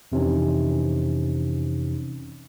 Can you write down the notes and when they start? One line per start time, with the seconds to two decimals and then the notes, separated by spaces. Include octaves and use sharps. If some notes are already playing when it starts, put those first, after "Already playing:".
0.12 F2 C3 E3 C#4 D#4